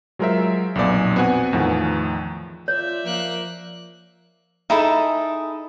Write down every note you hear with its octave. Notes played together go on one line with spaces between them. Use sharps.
F#3 G#3 F4 A#4 C5 E5
B1 F2 A#2 B3 D5 G#5
B3 C4 F#4 F#5 G#5
E2 A2 D#3 F3
F4 C#5 D5 E5
F3 A#3 F#6
D#4 E4 G#4 A4